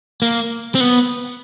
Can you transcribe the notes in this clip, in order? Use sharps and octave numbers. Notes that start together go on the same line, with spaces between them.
A#3
C4
B3